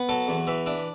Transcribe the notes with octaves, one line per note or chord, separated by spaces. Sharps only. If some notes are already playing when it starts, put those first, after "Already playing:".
Already playing: B3
F#3 A4
E2
E3 E5
D4 E5